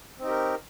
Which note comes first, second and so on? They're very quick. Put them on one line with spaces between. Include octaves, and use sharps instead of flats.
C4 D#4 G4 A#4